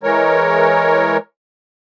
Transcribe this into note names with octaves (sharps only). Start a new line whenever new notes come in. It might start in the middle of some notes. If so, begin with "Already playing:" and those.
E3 G#3 A#4 C#5